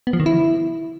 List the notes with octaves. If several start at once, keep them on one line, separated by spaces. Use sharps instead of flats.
B3
F3
D#3
E4